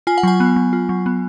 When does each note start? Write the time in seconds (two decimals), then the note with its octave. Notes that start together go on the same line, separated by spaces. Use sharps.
0.07 F4 G#5
0.18 F#5
0.23 F#3 G#5
0.40 B3
0.56 F#3
0.73 F4
0.89 F#3
1.06 B3